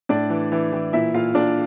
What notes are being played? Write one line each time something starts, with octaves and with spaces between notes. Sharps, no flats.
A2 D4 D5
E3
E3
E3
A#2 E4 E5
A#2 F4 F5
A#2 D4 D5